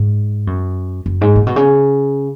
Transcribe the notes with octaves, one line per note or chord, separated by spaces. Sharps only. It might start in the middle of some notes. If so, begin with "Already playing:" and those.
Already playing: G#2
F#2
F#2
G#2
A#2
B2
C#3